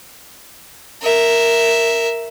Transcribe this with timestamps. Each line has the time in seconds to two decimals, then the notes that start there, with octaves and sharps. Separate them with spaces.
1.02 A#4 E5